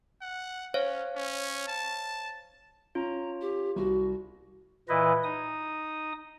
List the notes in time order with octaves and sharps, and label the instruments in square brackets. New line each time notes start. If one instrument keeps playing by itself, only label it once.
[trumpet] F#5
[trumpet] C#4 [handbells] C5 C#5 F5
[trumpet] C#4
A5
[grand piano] C#4 [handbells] F4 [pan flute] A#5
[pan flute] G4
[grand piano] C2 [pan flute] F#4
[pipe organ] A#2 E3 E4 B4 D#5
D#4 D#6